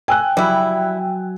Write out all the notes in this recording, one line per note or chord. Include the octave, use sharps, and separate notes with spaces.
G5 G#5 E6 F#6
F#3 G3 E4